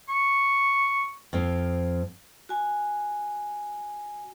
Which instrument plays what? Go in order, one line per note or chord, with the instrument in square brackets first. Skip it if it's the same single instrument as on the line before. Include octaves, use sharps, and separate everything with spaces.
[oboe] C#6
[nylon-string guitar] F2 F3 C4
[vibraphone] F#4 G#5